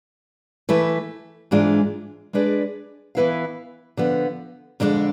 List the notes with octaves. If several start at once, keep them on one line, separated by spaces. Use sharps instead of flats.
E3 A3 E4 B4
G#2 E3 G#3 D4 F4
G#3 D4 G#4 B4 D5
E3 B3 E4 B4 F5
D3 F3 B3
F2 D3 G#3 D4